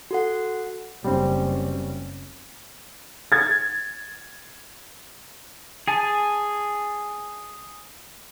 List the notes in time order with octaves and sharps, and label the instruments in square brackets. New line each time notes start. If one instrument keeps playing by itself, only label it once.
[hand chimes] F#4 A4 F#5
[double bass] F#1 C#4 [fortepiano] G3 C4
[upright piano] G#6 A6
[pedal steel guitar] G#4 G#5 A5